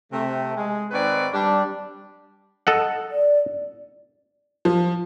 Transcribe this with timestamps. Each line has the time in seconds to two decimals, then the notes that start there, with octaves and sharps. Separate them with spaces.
0.12 C3 A3
0.56 G#3
0.91 G#2 D#3 C4 B4 C#5 D5
1.33 G3 D4
2.67 A4 D#5 F#5
3.11 D5
4.65 F3